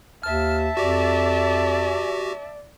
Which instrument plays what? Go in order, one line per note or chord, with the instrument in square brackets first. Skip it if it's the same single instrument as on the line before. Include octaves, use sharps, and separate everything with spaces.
[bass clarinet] D#2 [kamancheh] E5 A5 [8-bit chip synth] F6
[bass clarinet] F2 [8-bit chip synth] F#4 G4 [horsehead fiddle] D5